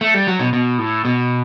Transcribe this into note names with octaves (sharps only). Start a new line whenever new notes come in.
A3
G3
F#3
B2
B2
A2
B2